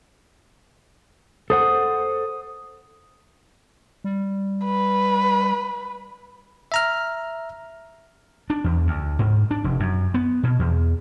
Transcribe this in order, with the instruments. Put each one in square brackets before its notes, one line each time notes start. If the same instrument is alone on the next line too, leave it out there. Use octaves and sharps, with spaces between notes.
[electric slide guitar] A4 C5 F#5 [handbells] D#6
[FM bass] G3
[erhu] B4
[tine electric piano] E5 A#5 F6
[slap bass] D4
E2
D2
G#2
D4
F1
F#2
B3
B2
E2